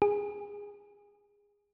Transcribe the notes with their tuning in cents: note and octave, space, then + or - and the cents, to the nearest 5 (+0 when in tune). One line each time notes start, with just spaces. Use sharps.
G#4 -20